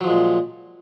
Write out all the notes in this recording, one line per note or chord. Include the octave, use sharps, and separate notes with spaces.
A#2 F3 F#3 G#3